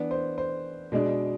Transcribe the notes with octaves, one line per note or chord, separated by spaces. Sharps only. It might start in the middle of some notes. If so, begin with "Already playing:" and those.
Already playing: E3 B3 D4
C5
C5
B2 G#3 D4